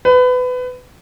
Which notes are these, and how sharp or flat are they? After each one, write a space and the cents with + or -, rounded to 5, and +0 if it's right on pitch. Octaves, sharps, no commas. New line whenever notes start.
B4 +25